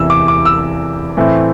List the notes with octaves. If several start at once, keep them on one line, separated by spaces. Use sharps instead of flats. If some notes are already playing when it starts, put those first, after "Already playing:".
Already playing: E2 C3 E3 E6
D6
D6
E6
A2 E3 A3 C4